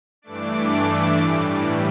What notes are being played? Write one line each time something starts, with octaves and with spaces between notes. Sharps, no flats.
G2 E3 A3 D4 D6
A2 E3 G3